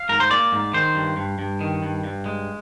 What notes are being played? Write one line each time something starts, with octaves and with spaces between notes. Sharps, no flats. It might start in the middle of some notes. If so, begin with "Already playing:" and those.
Already playing: F5
G#2 A#4
C5
A#3 D5
G#2
D#3 C5
G2
G2
G2
D#3
G2
G2
G#3